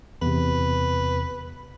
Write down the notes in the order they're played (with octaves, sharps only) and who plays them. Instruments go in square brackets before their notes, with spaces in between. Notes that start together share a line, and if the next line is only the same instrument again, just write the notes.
[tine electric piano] E2 C3 [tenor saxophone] B4